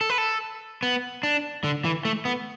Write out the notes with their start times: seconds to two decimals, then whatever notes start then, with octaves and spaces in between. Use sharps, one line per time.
0.01 A4
0.10 B4
0.18 A4
0.83 B3
1.23 D4
1.64 D3
1.85 E3
2.05 A3
2.25 B3